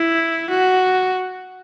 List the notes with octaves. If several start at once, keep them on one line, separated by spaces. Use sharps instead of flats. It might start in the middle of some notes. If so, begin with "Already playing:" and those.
Already playing: E4
F#4